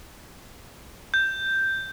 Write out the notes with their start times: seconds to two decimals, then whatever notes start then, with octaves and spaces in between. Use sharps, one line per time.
1.14 G6